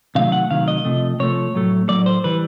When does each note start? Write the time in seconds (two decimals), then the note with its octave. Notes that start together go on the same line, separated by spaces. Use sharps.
0.15 C3 D#3 F#3 A3 F5
0.32 F#5
0.50 C3 D#3 F#3 A3 F5
0.68 D#5
0.85 C3 F3 A3
1.19 C3 F3 A3 C#5
1.54 A2 F#3 A3
1.89 A2 F#3 A3 D5
2.06 C5
2.24 E3 G3 B4